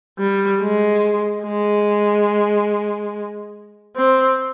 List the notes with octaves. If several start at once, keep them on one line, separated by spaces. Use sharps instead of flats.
G3
G#3
G#3
C4